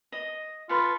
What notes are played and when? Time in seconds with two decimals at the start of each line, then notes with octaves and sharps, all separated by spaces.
0.12 D#5
0.69 F4 A4 B4 C#6